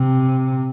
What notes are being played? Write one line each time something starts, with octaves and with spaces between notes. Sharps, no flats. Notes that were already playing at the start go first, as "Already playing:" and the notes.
Already playing: C3